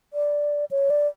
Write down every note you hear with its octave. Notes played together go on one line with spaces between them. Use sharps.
D5
C#5
D5